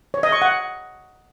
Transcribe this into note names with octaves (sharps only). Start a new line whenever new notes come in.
C#5
D#5
C#6
F#5